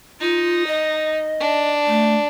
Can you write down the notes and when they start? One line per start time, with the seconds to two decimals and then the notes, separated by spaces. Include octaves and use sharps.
0.21 D#4 F4
0.67 D#5
1.40 D4
1.87 A3